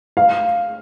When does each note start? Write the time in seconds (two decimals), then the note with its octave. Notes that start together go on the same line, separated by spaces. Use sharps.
0.17 F5